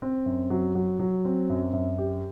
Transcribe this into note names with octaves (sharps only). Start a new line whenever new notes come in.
C4
F#2
F#3
F#3
F#3
C4
F#2
F#2
G4